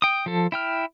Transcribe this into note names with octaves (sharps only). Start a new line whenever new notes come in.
G5 D#6
F3 A4
E4 G5 F6